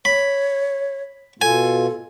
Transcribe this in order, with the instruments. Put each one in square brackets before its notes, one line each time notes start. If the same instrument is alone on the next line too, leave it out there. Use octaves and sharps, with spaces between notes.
[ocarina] C#5 [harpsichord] B5
[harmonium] B2 F4 [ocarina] A4 [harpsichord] G#5